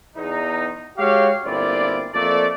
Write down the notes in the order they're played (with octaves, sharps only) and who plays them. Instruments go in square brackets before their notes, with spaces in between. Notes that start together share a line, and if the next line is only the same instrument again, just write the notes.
[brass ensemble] E2 D#4
G#3 F#4 G4 C#5 F5
G1 A#2 C4 E4 F4 D5
F2 A3 A#3 A4 D5